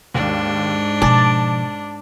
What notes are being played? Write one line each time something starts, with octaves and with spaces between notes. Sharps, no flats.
D#2 G#2 D4
B2 F3 D5 A5 A6